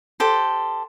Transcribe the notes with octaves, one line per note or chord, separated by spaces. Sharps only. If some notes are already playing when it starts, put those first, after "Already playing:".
G4 A4 C5